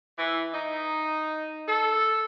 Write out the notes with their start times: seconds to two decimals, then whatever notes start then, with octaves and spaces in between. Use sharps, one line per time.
0.17 E3
0.54 D#4
1.68 A4